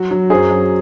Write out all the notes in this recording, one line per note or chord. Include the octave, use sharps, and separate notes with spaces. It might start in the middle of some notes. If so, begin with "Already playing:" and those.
Already playing: F#3 F#4
F#3
F#2 G#4 C5
F#2